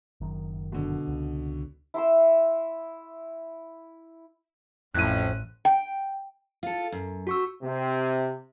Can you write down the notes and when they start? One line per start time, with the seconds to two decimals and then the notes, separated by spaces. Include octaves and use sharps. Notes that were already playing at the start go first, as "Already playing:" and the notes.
0.21 F#1 F#2 D#3
0.72 B2 D3
1.07 C#2
1.94 E4 C6 E6
4.95 A1 F2 A2 C#4 F#6 D#7
5.65 G5
6.63 F4 A4
6.92 F#2
7.27 F#4 C#6 E6
7.63 C3